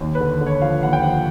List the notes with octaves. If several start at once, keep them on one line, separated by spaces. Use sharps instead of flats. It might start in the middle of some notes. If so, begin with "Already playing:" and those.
D#2
B4
D3
D3
C#5
F3 F5
D#2 F#5
G5
F3 F#5